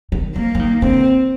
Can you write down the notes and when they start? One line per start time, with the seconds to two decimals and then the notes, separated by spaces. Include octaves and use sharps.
0.12 D#3
0.36 F3 A#3
0.55 F3
0.59 D#3
0.82 D3 C4